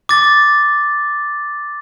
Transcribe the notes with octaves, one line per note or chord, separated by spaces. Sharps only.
D6 A6